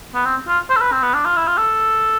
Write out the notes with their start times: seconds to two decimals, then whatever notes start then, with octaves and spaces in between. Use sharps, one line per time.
0.15 B3
0.26 C4
0.48 F4
0.70 C5
0.76 A4
0.81 B4
0.92 C4
1.03 B3
1.14 D4
1.25 F4
1.37 E4
1.47 F4
1.58 A4